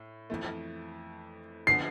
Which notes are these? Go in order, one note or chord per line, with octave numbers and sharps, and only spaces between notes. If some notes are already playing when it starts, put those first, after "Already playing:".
Already playing: A2
F2 E3 A3
D3 F3 B3 C7